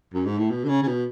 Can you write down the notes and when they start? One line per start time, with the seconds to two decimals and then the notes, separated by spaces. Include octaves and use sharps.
0.14 F#2
0.26 G#2
0.38 A2
0.50 B2
0.64 D3
0.68 C#3
0.83 C#3
0.87 B2